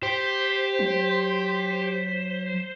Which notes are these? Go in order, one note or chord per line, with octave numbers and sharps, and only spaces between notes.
G4 C5 B6
F#3